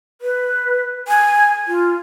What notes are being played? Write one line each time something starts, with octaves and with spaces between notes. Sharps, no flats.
B4
G#5
F4